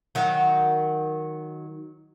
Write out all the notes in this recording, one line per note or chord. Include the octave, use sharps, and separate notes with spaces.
D#3 F#3